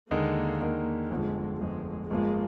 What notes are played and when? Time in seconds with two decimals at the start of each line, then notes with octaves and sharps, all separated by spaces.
0.11 D#2 D3 G#3 A#3 D#4 A#4
0.61 D#2 D3 G#3 D#4 A#4
1.10 G1 F2 D3 F3 G#3
1.61 G1 F2 D3 F3 G#3
2.10 G1 G2 F3 G#3 A#3 F4